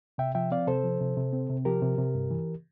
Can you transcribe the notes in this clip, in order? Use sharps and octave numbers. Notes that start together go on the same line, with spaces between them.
C3 E5 G5
F3 E5 G5
C4 D5 F5
C3 A4 C5
F3
C3
C3
C4
C3
F3 G4 A#4
C3
C3
G2
E3